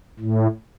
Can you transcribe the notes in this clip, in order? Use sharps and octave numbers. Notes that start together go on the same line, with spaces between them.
A2